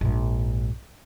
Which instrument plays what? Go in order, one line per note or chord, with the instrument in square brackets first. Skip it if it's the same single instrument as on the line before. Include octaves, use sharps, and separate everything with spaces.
[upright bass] A#1 G#2